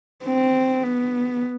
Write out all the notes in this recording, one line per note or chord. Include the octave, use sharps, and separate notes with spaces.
C4
B3